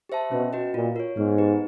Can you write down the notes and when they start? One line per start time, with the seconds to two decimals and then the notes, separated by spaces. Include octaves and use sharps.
0.09 G4 C5 E5 A5
0.31 B2 C#4
0.53 F#4 B4 D#5
0.74 A#2 F4
0.96 A#4 C#5
1.16 G#2 B3
1.38 D#4 G4 B4